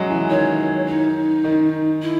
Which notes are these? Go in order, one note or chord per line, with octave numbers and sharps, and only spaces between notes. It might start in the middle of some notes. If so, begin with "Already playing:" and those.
Already playing: F#3 G#3
E3
D#3 C#5
D#4
D#3
E4